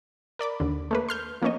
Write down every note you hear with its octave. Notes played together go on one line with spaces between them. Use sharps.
A#4 D5 B5 D6
D#2 D3
A3 A#3 B4
C6 F6 G6
F3 A#3 B3 C#4 C#5 D#5